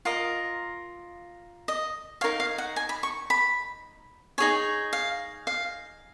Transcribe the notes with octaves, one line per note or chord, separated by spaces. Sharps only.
F4 A#4 D#5
D#5
D#4 A#4 C#5 F5
F5
F#5
G#5
B5
C#6
B5
D#4 G#4 C#5 G#5
F5
F5